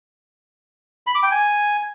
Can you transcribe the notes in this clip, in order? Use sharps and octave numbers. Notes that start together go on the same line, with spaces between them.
B5
D6
G5
G#5